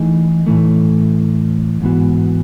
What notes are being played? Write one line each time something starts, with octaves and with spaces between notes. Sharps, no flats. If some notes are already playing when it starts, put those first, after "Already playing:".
Already playing: E3 A3 D#4 G#4
A2 E3 A3
G#2 E3 B3 F#4